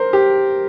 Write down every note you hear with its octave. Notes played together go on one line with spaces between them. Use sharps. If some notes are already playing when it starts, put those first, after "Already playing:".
Already playing: A#4 C5
G4